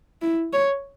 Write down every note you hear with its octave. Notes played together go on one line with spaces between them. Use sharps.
E4
C#5